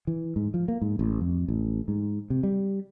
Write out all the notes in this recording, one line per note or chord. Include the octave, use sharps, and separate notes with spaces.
E3
G#2
F3
A#3
G#2
A1
F2
A1
G#2
C3
G3